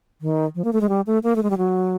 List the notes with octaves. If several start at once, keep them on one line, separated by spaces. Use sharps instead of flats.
D#3
F3
A#3
A3
G#3
G3
A3
A#3
A3
G#3
G3
F#3